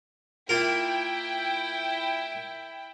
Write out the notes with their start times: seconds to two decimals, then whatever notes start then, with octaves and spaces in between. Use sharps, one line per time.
0.49 A#3 E4 F4 A#4 G5